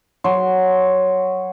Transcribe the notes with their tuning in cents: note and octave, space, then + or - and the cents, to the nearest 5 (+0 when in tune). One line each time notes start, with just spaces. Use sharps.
F#3 +0 C6 +0